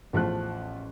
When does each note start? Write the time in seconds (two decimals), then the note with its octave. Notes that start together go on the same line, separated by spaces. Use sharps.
0.13 A1 E2 F3 A3 F#6